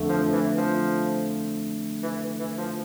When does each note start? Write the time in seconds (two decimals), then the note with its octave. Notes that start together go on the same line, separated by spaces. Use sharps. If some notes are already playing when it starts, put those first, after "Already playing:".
Already playing: F2 D3 A3
0.09 F3
0.33 E3
0.58 F3
2.03 E3
2.39 E3
2.58 F3